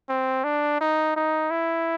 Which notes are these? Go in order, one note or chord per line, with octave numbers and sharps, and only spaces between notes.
C4
D4
D#4
D#4
E4